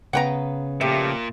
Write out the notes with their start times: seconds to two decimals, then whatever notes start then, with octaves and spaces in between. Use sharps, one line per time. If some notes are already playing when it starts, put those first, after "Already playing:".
0.13 C#3 B3 B4 F#5 G5 A#5
0.81 A#2 F3 A3 G4 E5